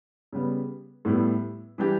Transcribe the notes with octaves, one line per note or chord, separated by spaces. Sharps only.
C#3 G3 B3
A2 G3 B3 E4
E3 G3 D4 G4